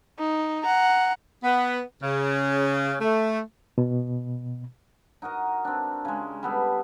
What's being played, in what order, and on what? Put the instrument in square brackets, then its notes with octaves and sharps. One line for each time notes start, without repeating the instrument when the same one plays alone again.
[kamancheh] D#4
F#5 A#5
[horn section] B3
C#3
A3
[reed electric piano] B2
[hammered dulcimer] D#4 F#4 A#4 D#5
C4 D4
C#3 G#3
G3 B3 A4